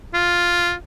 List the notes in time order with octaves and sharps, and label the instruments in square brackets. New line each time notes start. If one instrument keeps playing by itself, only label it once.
[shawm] F4